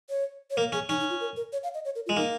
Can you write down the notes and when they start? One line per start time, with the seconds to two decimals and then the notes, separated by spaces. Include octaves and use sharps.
0.10 C#5
0.51 C#5
0.57 A#3 A#4
0.72 C#4 G#4
0.89 C#4 D#4
1.00 D#4
1.10 F4
1.20 A#4
1.36 A#4
1.52 C#5
1.63 F5
1.74 D#5
1.85 C#5
1.95 A#4
2.06 F4
2.09 G#3
2.17 A#3 D#4